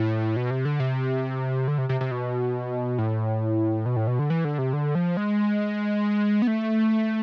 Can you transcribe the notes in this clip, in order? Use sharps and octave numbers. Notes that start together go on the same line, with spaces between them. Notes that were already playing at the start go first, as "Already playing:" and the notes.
Already playing: A2
B2
C3
D3
C3
D3
C3
C3
C3
B2
A2
B2
A2
B2
D3
E3
D3
C3
D3
F3
G#3
B3
A3